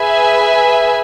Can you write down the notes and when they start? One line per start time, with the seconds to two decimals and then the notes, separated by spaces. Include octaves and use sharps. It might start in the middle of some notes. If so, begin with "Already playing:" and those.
Already playing: G#4 B4 E5 G#5